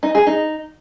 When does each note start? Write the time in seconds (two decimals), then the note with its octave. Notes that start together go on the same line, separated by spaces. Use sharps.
0.03 D#4
0.15 G#4
0.27 D#4